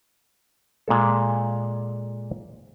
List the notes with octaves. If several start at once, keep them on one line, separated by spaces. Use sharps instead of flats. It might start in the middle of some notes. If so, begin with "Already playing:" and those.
A#2 G#3 A4